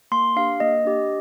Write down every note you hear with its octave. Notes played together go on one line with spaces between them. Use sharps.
A#3 C6
D4 G4 F5
A#3 D#5
D4 G4